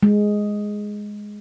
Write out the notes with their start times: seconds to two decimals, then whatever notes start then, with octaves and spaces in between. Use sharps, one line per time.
0.03 G#3